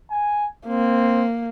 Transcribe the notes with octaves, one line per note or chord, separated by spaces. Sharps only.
G#5
A#3 C4